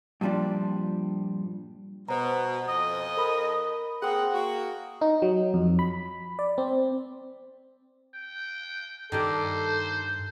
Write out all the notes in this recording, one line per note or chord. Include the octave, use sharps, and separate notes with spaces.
G2 A#2 F3 G3 D4
B2 C5 A#5
F2 D#5
A#4 B5
A#3 C4 G#4 F#5 G5 D#6
A#3 F#4
D#4
F#3
F2
B5
D5
C4
G5
G2 D#3 G3 G4 A4 C5